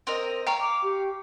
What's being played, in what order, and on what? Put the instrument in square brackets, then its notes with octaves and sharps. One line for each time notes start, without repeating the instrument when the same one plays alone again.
[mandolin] C4 A#4 D#5
[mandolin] C#5 F5 [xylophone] G5 A#5
[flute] D6
G4